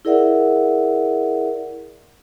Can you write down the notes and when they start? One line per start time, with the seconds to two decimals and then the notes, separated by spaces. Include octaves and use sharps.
0.05 E4 G#4 A#4 D5 E5 F#5